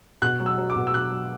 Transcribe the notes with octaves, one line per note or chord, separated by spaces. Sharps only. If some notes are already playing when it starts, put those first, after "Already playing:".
B2 F#6
F#3
E6
F#3
D6
B2
E6
B2 F#6
F#3